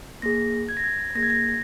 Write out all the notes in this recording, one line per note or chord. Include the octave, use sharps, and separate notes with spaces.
A#3 G#4 A#6
G#6
A#6
G#6
A#3 G#4 A#6
G#6
A#6